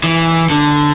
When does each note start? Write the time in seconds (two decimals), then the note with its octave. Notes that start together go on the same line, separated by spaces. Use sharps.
0.04 E3
0.50 D3